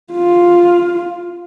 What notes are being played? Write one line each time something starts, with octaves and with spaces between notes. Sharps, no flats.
F4